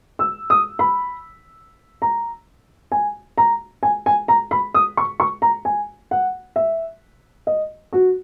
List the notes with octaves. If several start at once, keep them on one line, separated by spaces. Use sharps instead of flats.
E6
D#6
B5
A#5
G#5
A#5
G#5
G#5
A#5
B5
D#6
C#6
C#6
A#5
G#5
F#5
E5
D#5
F#4